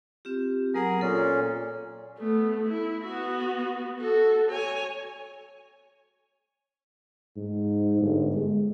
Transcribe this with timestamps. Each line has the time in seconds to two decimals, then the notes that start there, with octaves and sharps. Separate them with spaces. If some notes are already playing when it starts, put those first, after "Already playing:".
0.25 C4 F4 G4
0.74 F#3 B3 G#4 A#4 F#5
1.01 A#2 C#4 A4
2.18 A3 B3
2.62 E4
3.04 B3 F#4
3.99 F#4 A4
4.51 C#5 G#5
7.36 G#2
8.01 G1
8.35 G#3